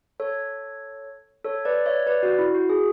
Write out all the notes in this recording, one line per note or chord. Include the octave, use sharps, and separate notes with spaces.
A4 C#5
A4 C#5
B4 D5
C#5 E5
B4 D5
F#4
E4
F#4
G#4